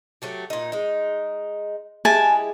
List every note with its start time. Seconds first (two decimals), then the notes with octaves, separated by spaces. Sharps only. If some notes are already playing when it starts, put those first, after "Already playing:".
0.22 F#3 A3 G4
0.50 A#2 D#4
0.72 G#3 D#4
2.05 G#3 E4 G4 G#5 A5